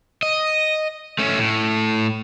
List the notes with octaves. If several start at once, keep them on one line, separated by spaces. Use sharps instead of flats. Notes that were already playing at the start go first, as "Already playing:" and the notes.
D#5
A3 C#4
A2